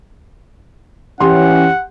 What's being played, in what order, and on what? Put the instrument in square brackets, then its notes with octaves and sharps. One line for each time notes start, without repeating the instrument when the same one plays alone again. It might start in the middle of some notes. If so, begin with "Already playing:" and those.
[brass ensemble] E3 C#4 [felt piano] G4 C6 [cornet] F#5